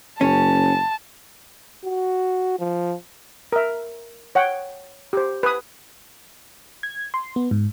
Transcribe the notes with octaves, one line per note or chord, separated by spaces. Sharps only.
F#1 C#4 A5
F#4
F3
A#4 E5
C#5 F#5 G5
G4 C5
B4 D#6
G#6
C6
B3
G#2